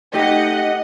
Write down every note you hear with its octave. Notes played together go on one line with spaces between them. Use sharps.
A3 D#4 G4 D#5 F#5